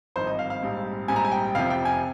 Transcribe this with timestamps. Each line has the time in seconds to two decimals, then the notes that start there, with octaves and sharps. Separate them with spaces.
0.16 G#1 G2 F3 C4 D#4 C5
0.27 D#5
0.39 F5
0.50 F5
0.62 A#1 G#2 G3 C4
1.08 A#1 G#2 G3 C4 G#5
1.16 A#5
1.25 G#5
1.32 G5
1.55 F1 F2 C3 F3 F5
1.70 G5
1.85 G#5